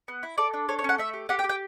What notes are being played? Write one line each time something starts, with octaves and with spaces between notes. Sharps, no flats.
B3
E4
A4 D5
D4
A4 C#5
C#5
C#4 F#5
A3 E5
G4
G4 F#5
G5
G4
G5